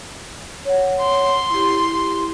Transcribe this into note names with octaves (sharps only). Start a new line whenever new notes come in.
C#5 F#5
C6
E4 G4